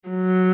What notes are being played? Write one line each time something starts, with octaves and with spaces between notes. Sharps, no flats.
F#3